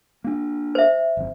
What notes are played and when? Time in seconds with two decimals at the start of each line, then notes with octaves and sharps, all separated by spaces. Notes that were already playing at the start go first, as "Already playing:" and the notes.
0.24 A#3 D4
0.75 C5 E5
1.17 G1 F2